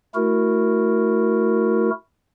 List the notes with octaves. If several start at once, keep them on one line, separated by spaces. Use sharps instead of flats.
A3 E4 F#4 A#4